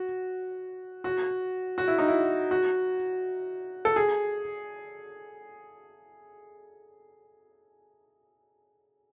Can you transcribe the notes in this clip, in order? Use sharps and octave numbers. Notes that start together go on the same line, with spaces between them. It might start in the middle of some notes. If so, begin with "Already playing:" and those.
Already playing: F#4
F#4
F#4
E4
D#4
E4
F#4
A4
G#4